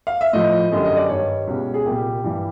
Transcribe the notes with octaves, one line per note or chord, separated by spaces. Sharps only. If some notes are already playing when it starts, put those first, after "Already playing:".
F5
E5
A2 F3 D#5
F#2 D3 G3 D#5
D#5
D5
G2 D#3 G3 C#5
C#2 B2 G3
G#4
C2 A#2 G3 G4
G2 E3 G3